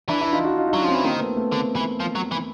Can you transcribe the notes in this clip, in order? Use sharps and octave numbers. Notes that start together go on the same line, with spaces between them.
E3 D4 E4
D4 E4
D#4 F4
E4 F#4
D#4 F4
D#4
F#3 D4 E4
C#4
F3 C4 D4
E3
D#3 A#3 C4
A3 B3
A3 B3
D3 A#3 C4
E3
F3
F#3
E3